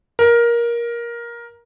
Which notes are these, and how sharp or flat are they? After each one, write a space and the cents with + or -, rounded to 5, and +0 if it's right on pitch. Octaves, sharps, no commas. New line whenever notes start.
A#4 +15